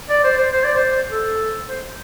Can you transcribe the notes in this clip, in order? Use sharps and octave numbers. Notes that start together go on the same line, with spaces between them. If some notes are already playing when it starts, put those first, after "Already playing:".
D5
C5
C5
C5
D5
C5
A4
C5